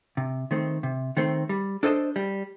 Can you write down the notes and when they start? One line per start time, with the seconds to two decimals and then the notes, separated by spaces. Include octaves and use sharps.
0.17 C3
0.51 D#3 A3 C4
0.83 C3
1.17 D#3 A3 C4
1.49 G3
1.83 D4 A4 C5 D#5
2.16 G3